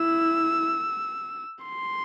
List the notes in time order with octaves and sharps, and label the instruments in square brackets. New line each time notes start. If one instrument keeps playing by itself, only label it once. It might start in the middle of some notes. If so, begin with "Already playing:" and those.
Already playing: [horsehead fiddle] E4 [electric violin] E6
[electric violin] C6